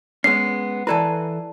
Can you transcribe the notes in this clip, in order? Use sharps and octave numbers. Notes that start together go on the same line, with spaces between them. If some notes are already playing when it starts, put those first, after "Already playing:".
G#3 B3 C#4 C7
E3 E4 A4 B4 D5 A5